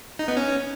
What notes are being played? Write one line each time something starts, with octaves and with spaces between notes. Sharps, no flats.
D#4
B3
C#4